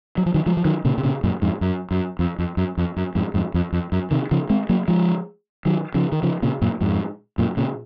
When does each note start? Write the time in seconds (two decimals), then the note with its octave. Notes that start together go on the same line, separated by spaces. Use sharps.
0.18 F#3
0.26 F3
0.34 D#3 F#3
0.46 F3 G#3
0.57 F3
0.65 D#3 F#3
0.85 A#2 C#3
0.98 C3
1.03 A#2 C#3
1.24 F#2 A#2
1.42 F2 G#2
1.61 F#2
1.91 F#2
2.19 F2
2.39 F2
2.57 F#2
2.77 F2
2.97 F#2
3.15 F2 G#2
3.34 F2 G#2
3.54 F2
3.73 F2
3.92 F#2
4.11 C3 D#3
4.31 C#3 F3
4.50 G#3 C4
4.69 F#3 A#3
4.88 F3 G#3
5.65 D#3 F#3
5.94 C#3 F3
6.12 D#3
6.23 C#3 F3
6.42 A#2 C#3
6.61 F#2 A#2
6.81 F2 G#2
7.38 F#2 A#2
7.57 A#2 C#3